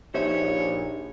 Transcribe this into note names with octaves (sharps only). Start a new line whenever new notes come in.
A#1 D#4 G4 C5 C#5 E5